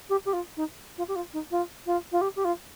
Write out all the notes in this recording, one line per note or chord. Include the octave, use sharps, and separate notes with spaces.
G4
G4
F4
D#4
F4
G4
F4
D#4
F4
F4
F4
G4
G4
F4